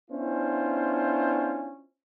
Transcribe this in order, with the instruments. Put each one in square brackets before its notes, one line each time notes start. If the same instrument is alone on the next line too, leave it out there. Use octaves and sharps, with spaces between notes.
[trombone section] B3 C#4 D4 E4 F4 C5